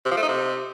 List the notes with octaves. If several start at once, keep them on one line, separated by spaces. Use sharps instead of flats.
C3
F3
A3
D#4
C3